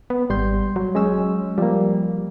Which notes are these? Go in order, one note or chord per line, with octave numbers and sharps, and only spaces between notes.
B3
G#1 G3 C6 G6
F#3
G#3 C#4 E6
F3 G3 A#3